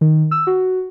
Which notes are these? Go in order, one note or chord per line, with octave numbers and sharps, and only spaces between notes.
D#3
E6
F#4